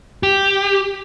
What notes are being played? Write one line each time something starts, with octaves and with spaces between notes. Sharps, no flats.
G4